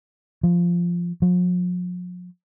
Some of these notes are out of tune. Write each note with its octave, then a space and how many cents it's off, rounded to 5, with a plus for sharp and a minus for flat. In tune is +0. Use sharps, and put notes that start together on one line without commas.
F3 -5
F3 +45